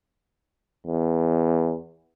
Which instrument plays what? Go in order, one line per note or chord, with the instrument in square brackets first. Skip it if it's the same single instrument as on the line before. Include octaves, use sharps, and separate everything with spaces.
[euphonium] E2